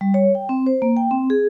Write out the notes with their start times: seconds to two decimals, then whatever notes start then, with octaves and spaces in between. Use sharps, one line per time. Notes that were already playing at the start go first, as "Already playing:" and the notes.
0.01 G3
0.14 C#5
0.35 G5
0.49 C4
0.66 C5
0.82 A#3
0.97 G5
1.11 C4
1.30 G#4